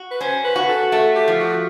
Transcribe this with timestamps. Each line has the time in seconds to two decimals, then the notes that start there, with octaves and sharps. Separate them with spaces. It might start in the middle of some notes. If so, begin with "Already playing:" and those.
Already playing: F#4
0.11 B4
0.21 C#4 C5
0.44 B4
0.56 F#4
0.68 A4
0.92 A3 A4
1.15 G4
1.28 F3
1.39 F#4